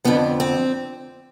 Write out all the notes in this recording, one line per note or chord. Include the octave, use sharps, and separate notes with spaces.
F2 D3 F3 B3
C4